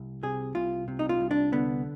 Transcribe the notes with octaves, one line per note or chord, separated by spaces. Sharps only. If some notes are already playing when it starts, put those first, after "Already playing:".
Already playing: C2
C3 G#4
C2 F4
C3
D#4
F4
C2
D4
D3 B3